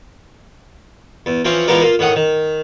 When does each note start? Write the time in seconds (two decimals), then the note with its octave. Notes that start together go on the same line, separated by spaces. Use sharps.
1.26 E2
1.45 E3 F3 C4 C#4 C#6
1.67 E3 F3 G#3 B3 A#4 D5
1.81 A#3 F4
1.99 A2 D#3 F#5 D#6
2.16 D#3